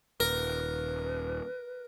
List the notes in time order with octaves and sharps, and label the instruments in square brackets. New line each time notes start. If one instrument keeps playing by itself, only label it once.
[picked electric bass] D#1 [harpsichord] A#4 [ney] B4